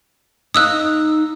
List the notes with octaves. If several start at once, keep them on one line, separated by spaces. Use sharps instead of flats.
D#4 F5 D#6 E6 F#6